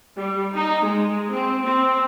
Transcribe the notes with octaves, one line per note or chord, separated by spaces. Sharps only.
G3
D#4
G#3
C4
C4